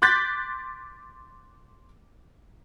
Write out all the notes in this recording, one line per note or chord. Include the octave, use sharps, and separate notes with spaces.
C6 D6 F#6 G6 A6 B6